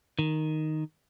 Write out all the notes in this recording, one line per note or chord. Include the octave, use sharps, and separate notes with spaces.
D#3